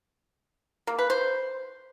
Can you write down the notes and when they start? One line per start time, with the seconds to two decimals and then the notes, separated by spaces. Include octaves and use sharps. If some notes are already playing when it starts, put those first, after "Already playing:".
0.87 A#3
0.99 B4
1.10 C5